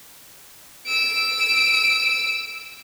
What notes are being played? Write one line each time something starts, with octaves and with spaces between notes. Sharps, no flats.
E6 D7